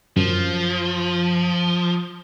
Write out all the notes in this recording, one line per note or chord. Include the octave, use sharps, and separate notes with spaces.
F#2 F3